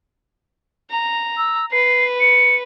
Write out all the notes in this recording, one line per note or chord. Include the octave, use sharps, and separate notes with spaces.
A#5
E6
B4 C7
C#7